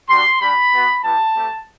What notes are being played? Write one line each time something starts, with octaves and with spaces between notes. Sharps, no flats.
G3 D4 F#4 C6
G3 D4 G4 B5
B3 F#4
G3 B3 E4 G4 A5
A3 C4 G4